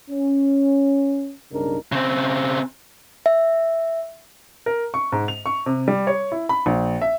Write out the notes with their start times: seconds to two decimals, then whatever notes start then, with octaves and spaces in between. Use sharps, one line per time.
0.11 C#4
1.52 B1 G2 C#3 D4 D#4 A#4
1.92 C#3 C4
3.26 E5
4.66 A#4
4.94 C#6
5.12 G#2
5.28 F7
5.46 C#6
5.66 C3
5.88 G3
6.07 C#5
6.32 E4
6.49 B5
6.66 A#1
7.02 E5